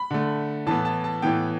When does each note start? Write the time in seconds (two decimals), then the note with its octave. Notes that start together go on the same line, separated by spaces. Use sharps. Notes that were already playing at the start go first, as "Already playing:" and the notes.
Already playing: B5
0.11 D3 A3
0.66 A2 E3 B3 A5
0.85 A5
1.04 A5
1.22 A2 E3 B3 G5